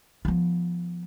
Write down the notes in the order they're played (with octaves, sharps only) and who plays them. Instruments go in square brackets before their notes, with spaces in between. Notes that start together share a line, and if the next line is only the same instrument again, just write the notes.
[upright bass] F3 B3